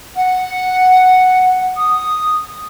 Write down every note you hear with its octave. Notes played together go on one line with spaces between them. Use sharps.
F#5
D#6